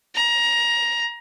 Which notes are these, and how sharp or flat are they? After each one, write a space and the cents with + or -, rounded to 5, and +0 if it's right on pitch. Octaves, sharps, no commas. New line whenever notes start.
A#5 +20